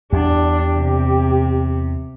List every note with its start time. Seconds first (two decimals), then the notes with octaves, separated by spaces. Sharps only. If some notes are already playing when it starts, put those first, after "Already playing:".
0.13 E2 D4 G4
0.75 C3